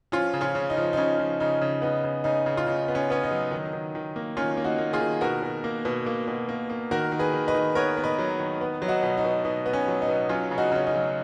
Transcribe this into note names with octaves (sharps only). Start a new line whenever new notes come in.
F3 C#4 F4
C#3
C#4 F4
C#3
D#4
F3
D#4
C#3 C#4
F3
C#3 D#4
C#3
B3 D#4
C#3
C#3 D#4
C#3
F4
C#3 D#4
B3
C#4
B3 C#4
D#4
F#3
D#3
D#3
D#3
A#3
D#3 C#4 F4
A#3
D#4 F#4
A#3
F4 G#4
D#3
B2 F#4 A#4
B2
A#3
B2
A#3
B2
A#3
A#3
D#3 F#4 A#4
D#3
G#4 B4
D#3
B4 D#5
D#3
B3 A#4 C#5
B3
B4 D#5
F#3
D#3
B3
F#3
D#4 F#4
B2
D#4
B2
B2 D#4
B3
C#4
F#3
D#4
B2
F#3 C#4 F4
C#3
D#4 F#4
C#3 C#4
D#4
F#3